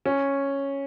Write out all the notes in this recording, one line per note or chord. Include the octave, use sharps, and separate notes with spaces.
C#4